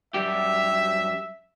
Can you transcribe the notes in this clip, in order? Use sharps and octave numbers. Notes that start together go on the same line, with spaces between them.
F#2 G3 G4 E5